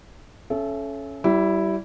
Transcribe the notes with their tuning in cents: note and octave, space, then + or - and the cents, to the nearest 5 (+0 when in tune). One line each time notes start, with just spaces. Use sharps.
C#4 +0 A4 -25 E5 +25
G3 -30 E4 +0